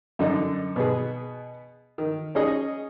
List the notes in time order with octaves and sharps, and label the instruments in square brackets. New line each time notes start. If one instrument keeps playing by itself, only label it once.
[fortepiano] F#2 D3 D#4
B2 B3 G#4
D#3
C#4 D#4 G#4 D#5